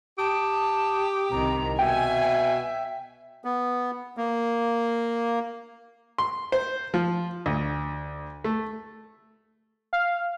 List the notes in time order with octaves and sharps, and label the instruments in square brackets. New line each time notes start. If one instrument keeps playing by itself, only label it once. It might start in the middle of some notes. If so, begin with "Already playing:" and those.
[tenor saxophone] G4 [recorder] A5 [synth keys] D#6
[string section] C2 C3 D#3 [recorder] A#5
[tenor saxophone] B2 [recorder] E5 [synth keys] G5 [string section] G#5
[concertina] B3
A#3
[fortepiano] C6
C5
F3
D2
A3
[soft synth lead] F5